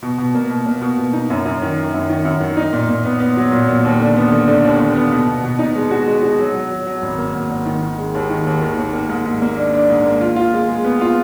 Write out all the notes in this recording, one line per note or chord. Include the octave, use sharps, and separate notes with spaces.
B2
B2
A#3
B2
A#3
B2
B2
D#4
F#2
F#2
D#3
D#3
F#2
D#3
F#2
D#3
D#4
A#2
A#2
B3
B3
F#3
A#2
A#2
D#2
D3
B3
D3
D3
D#2
D#2
B3
B2
B2
B2
D#4
G#3
F#4
G#3
F#4
F#3
F#3
F#3
F#3
G#1
A#3
G#1
G#1
D#3
D#3
G#3
D#2
D#3
D#2
D#3
D#2
A#3
G#2
G#2
A#3
D4
D4
G#2
A#3
F4
F4
G#3
G#3
B3
F4